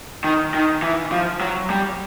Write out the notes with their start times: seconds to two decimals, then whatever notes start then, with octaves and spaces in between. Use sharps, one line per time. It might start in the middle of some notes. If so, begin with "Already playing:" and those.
0.24 D#3
0.54 D#3
0.82 E3
1.12 F3
1.40 F#3
1.70 G3